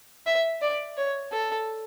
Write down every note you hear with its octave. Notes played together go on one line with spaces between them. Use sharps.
E5
D5
C#5
A4